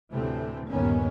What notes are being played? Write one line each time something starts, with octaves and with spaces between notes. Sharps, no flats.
D2 A2 C3 E3 A3 C4
G1 D#2 A#2 D#3 B3 C#4